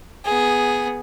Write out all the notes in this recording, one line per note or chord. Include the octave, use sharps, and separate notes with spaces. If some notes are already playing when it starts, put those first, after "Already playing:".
B3 G#4